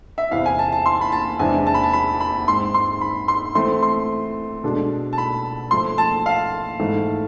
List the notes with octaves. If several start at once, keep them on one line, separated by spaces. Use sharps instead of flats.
E5
E2 C3 E3 F5
G#5
A5
A5
C6
B5
A5
E2 C3 G#3 D4 G#5
A5
B5
A5
B5
B5
G#2 G#3 C4 C6
C6
B5
C6
E3 A3 C4 C6
C6
B2 G#3 D4 A4
A5
B5
A2 F3 A3 C6
A5
F5
G#2 E3 A3